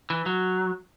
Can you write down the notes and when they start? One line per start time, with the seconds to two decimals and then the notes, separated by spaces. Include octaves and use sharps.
0.10 E3
0.26 F#3